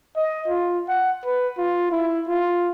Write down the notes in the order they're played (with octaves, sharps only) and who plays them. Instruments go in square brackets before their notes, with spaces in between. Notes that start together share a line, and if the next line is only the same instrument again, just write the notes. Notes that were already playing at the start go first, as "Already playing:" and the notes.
[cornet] D#5
F4
F#5
B4
F4
E4
F4